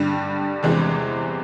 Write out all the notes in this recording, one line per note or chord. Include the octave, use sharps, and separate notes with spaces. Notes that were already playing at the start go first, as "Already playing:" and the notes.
Already playing: G2 D3 G3
E2 C3 E3 G#3